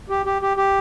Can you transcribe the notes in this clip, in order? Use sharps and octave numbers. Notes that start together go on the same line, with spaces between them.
G4
G4
G4
G4